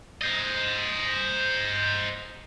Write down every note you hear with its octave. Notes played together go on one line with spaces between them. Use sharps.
C5 D#5